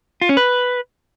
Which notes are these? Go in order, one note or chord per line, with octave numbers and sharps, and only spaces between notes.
F4
C#4
B4